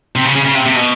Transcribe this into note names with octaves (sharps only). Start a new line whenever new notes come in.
C3
C#3
C#3
C#3
C3
C3
B2